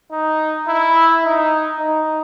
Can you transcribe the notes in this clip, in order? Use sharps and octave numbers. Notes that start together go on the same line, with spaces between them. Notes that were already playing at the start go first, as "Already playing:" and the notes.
D#4
E4
D#4
D#4